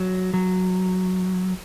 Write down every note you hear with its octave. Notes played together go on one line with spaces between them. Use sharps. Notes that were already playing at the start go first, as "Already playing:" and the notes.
Already playing: F#3
F#3